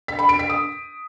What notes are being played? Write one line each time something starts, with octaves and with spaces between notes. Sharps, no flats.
B6
B5
D7
B6
D#6